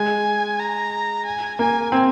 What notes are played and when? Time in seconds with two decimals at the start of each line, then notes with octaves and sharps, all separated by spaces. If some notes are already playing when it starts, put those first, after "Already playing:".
Already playing: G#3 G#5
0.60 A#5
1.25 G#5
1.59 A#3 G#5
1.92 C4